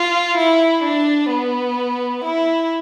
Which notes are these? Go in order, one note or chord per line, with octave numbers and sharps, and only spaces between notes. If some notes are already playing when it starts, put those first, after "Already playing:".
Already playing: F4
E4
D4
B3
E4